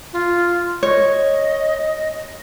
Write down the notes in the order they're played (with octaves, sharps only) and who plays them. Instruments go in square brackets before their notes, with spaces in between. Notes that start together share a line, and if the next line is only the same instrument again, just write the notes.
[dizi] F4
[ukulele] C#5 [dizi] D#5